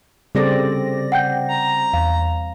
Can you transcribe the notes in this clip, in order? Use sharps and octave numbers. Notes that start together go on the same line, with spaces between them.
C#3 G3 C4 G#4 A4 D5 A#6
F#5 G5 G6
A#5
E2 F5